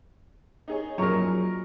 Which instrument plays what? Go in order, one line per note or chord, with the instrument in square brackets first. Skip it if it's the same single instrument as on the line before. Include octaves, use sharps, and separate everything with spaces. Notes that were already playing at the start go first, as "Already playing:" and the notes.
[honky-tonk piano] D#4 G#4 C#5
[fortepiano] F#2 A#2 A#5 [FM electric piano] F3 F#3 [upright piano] A#4 C#6